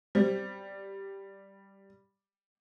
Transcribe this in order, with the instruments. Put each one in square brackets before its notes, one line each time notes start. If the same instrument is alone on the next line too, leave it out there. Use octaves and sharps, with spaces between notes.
[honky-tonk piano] G3 [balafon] C5